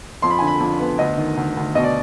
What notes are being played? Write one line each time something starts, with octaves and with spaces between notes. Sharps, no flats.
F2 C6
B5
G#5
D3
B5
F2
B3
D2 D#5
D#3
D2
D2
B2 D#5
D5